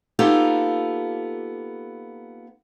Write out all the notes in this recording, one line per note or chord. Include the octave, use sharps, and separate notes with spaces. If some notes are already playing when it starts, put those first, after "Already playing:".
A#3 B3 D#4 F4 G4 A4